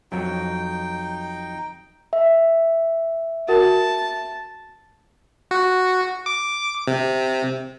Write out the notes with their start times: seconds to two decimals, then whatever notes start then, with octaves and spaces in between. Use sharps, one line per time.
0.12 F2 F#3 D#4 G5
2.13 E5
3.48 F#4 A#4 F#5 A5
5.51 F#4
6.26 D6
6.87 C3